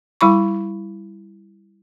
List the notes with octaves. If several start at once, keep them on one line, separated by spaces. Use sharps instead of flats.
G3 E4 B5 C#6